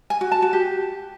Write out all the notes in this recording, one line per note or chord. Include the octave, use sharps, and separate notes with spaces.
G#5
F#4
A5
F#4
G4